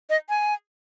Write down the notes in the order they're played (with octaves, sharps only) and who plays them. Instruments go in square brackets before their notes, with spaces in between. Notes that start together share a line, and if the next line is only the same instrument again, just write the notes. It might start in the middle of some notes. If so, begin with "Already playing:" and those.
[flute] D#5
G#5